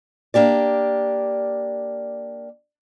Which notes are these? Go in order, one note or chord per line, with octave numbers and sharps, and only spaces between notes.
A#3 D4 G4 D5